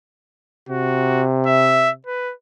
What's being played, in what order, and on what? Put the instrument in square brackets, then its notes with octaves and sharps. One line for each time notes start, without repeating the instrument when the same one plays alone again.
[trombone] C3 [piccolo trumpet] F#4
[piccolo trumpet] E5
B4